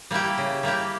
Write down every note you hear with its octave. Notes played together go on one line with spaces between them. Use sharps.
G3 A#3 E4 G4
C#3
G3 A#3 E4 G4